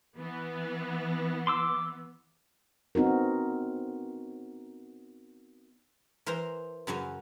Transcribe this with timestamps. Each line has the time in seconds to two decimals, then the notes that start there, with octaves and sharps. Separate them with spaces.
0.18 E3 B3
1.47 C6 D6 E6
2.95 B3 C4 D#4 F#4 A#4
6.26 E3 A#4 C5 A#5
6.87 F#2 C#3 F#3 C#4